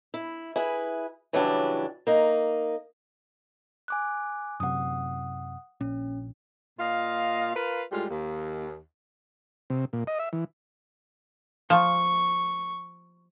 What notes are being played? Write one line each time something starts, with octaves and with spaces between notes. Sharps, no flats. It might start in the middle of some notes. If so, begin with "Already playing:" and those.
E4
E4 G#4 B4
C#3 E3 F#3 G3 D4
A#3 D#4
G#5 D6 F#6
F#2 C3 F#5 D#6
A#1 C#4
A#2 F4 D#5 F5
F4 A#4 B4 F5
A2 G3 G#3 F4
D#2
C3
A#2
D#5
E5
E3
F3 C#6